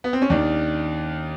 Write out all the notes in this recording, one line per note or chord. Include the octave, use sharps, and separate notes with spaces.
B3
C4
C#4
D#2 D#3 D4